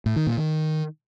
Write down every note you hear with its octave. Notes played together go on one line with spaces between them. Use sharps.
A2
D#3
A#2
D#3